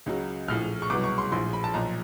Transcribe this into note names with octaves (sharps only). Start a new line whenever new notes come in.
C#2 C#3 F#3
A#1 A2 F3 F6
C#6
C2 B2 F#3 D6
C#6
C6
A#1 A2 F3 C6
B5
A5
B1 A#2 F3 A#5